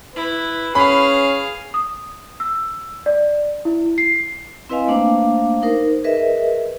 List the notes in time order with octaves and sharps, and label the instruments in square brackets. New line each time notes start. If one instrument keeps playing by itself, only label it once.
[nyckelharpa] E4 [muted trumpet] B4
[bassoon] C#4 [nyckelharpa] G#4 F5 [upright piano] B5
[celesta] D#6
E6
D5
E4
C7
[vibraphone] C4 E4 B4 D#5 F5 G#5
A3 A#3 D4 C5 F5 D6
D#4 A#4 C5
G#4 A#4 B4 D#5 E5